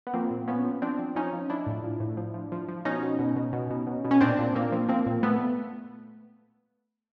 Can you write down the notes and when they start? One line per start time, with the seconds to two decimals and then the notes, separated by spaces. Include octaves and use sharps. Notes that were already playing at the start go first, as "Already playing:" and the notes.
0.07 B3
0.14 F3 A#3 C4
0.31 A#2
0.48 F3 B3 C#4
0.65 F3
0.82 F3 C4 D4
0.99 F3
1.15 F3 C#4 D#4
1.33 F3
1.50 F3 D4 E4
1.67 A2
1.84 F3
2.00 A2
2.17 F3
2.34 F3
2.52 F3
2.68 F3
2.85 B2 C#4 D#4
3.03 B2
3.19 B2
3.36 B2
3.53 B2
3.70 B2
3.87 B2
4.05 B2
4.11 C#4
4.21 A#2 C4 D4
4.39 A#2
4.55 A#2 A#3 C4
4.72 F3
4.89 F3 A#3 C4
5.06 A#2
5.23 A#2 A3 B3